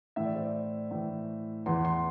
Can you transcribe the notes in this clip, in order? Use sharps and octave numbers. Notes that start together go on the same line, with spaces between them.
A2 E3 E5
D5
C5
D5
A2 E3
E2 E3 C6
C6